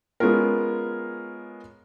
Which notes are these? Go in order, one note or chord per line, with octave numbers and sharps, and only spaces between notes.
G#3 B3 C#4 F4 A#4